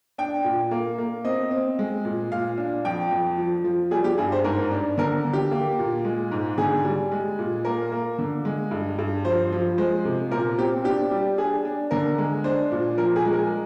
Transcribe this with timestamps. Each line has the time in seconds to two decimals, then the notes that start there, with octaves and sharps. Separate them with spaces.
0.18 D4 G5
0.44 A#2
0.71 A#3
0.98 A#3
1.25 C4 D#5
1.51 C4
1.79 G#3
2.05 A#2
2.32 A#2 F5
2.58 D4
2.85 F2 G5
3.11 F2
3.38 F3
3.64 F3
3.91 G3 G#4
4.04 G4
4.18 G2 G#4
4.32 C5
4.44 G#2 A#4
4.72 D4
4.98 D3 A#4
5.25 D3
5.33 G4
5.51 A#3
5.79 A#2
6.05 G#3
6.31 G#2
6.58 D3 G#4
6.85 G3
7.12 G#3
7.39 A#2
7.65 A#3 A#4
7.92 A#3
8.19 D3
8.45 G#3
8.71 G2
8.99 G2
9.25 F3 C5
9.52 F3
9.78 G#3 C5
10.05 C3
10.31 A#2 A#4
10.58 C4 G4
10.84 D4 G4
11.11 G3
11.38 D4 G#4
11.65 D4
11.91 D3 A#4
12.18 G#3
12.44 D4 C5
12.71 A#2
12.97 F3 A#4
13.16 G#4
13.25 G#3
13.33 A#4